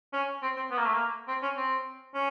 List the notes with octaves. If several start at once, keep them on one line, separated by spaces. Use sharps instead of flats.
C#4
C4
C4
B3
A#3
A3
A#3
C4
C#4
C4
C#4